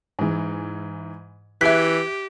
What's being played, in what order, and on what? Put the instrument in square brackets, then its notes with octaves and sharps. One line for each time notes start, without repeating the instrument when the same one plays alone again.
[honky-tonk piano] G#2 E3
[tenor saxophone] E3 [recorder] G4 [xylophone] E5 B6 [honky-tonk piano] F#6 G#6